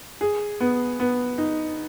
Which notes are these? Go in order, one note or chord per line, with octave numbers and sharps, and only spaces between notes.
G#4
B3
B3
D#4